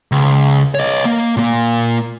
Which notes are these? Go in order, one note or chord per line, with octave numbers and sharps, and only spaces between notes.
C#2
C#5 D#5
A#3
A#2 A#3